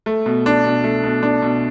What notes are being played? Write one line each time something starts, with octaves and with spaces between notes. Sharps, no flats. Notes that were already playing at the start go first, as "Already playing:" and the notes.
A3
B2
D4
B2
A3
B2
D4
B2